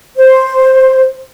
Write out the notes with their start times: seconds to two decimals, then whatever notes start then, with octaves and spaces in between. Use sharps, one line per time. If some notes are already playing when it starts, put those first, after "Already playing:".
0.18 C5